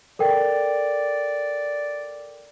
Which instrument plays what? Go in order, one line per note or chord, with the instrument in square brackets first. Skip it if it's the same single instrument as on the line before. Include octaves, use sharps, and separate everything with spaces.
[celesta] A4 A#4 G5 [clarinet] D5